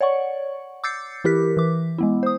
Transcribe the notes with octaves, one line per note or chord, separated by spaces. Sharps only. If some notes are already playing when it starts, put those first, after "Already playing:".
C#5 D5 F#5 C#6
D6 E6 G6 A6 C7 C#7
E3 E4 G4 A#4 F#6 B6
E3 D6
G#3 B3 E4
C5 D#6